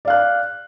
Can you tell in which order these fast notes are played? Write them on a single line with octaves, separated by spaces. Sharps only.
D5 F5 F#6